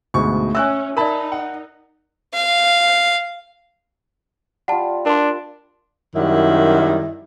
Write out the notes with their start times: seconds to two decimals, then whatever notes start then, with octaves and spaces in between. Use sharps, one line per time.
0.14 D2 G#2 B2 C#6
0.55 C#4 E5 G#5 E6 F#6
0.97 D#4 A#4 D5 E5 A5 B5
1.32 F#5
2.34 F5
4.68 G3 F4 F#5 A5
5.06 D4 A#4 C6
6.16 F#2 D#3 G3 E4